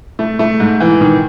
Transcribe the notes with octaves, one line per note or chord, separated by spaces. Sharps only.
A3
A3
G#2
E3
D#3